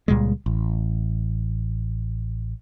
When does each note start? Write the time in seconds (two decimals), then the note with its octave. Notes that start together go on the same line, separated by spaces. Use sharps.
0.08 C#2 A#2 G3 G#3
0.46 A1